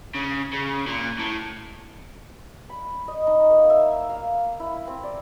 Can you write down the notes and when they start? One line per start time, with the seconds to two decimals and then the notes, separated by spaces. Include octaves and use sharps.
0.15 C#3
0.53 C#3
0.87 A#2
1.19 A2
2.70 B5
3.08 D#5
3.27 D#4
3.50 A#3
3.70 E5
4.09 F5
4.60 E4
4.87 C4
5.03 D5